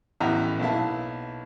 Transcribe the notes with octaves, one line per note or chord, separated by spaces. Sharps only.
A1 E2 B3 E5 G5 A#5
B1 A#3 E4 A5